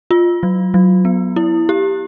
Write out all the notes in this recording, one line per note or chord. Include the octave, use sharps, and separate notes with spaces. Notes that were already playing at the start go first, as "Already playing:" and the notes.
F4
F#3
F#3
B3
E4
G4